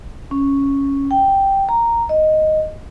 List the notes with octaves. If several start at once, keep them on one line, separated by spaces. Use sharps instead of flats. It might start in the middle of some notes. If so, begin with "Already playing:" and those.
C#4
G5
A#5
D#5